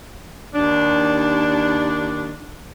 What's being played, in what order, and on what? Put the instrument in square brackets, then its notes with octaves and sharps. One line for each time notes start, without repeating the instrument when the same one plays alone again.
[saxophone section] D#2 D4